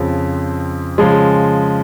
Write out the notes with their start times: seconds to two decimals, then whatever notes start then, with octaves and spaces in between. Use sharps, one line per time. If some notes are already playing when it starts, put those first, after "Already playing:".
Already playing: F2 C#3 F3 C4
0.98 C#3 F3 G#3